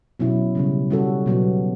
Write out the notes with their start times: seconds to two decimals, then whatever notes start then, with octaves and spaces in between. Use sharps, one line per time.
0.20 B2 F#3 C#4 E4
0.55 C#3 G3 C#4
0.90 G3 C#4 F#4 A4
1.26 B2 F#3 B3